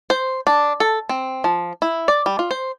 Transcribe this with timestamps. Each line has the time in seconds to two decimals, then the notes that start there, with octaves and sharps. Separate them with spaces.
0.10 C5
0.47 D4
0.80 A4
1.09 C4
1.44 F3
1.82 E4
2.08 D5
2.26 G3
2.39 F4
2.51 C5